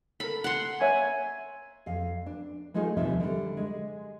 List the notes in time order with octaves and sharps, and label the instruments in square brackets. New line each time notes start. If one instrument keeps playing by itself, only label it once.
[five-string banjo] A4 A#4 [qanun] B5
[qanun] F#5 C6
[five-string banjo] A#3 C#5 E5 [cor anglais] G#5
[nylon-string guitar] F2 F5
D4
G#3 A3 D#4 F4 G#4
D#2 C3 F3 G3 D#4 E5
D3 G3
G#3